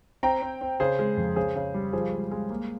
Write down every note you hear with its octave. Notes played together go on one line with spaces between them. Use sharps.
C4 G5 A#5
C4
C4
C#3 G#4 C5
G#3
F2
C#3 G#4 C5
C#3
G3
F3 G#4 C5
G#3
G#3
A#3